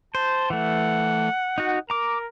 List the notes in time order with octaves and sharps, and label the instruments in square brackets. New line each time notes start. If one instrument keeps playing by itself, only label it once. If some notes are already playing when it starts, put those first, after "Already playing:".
[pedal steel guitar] C5 [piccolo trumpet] A5
[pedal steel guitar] E3 A3 [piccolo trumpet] F#5
[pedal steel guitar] D#4 F#4
[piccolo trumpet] A#4 [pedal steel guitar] A#5 D6